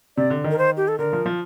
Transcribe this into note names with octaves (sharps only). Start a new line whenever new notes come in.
C3 D5
D3
D#3
A#4
C5
G4
A4
D3 A#4
F3
F3